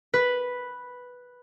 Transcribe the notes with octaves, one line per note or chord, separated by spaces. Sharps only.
B4